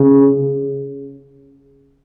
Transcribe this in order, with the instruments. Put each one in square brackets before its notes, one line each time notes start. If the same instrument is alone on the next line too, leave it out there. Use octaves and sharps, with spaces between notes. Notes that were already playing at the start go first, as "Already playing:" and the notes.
Already playing: [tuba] C#3